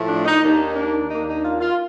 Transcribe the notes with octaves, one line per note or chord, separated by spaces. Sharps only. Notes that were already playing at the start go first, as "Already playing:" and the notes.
Already playing: A2 F3 A3
D4
D#4
D#2 D#3 A#3 D4 D#4
D4
D#2 D#3 A#3 D4 D#4
D#4
F4
F4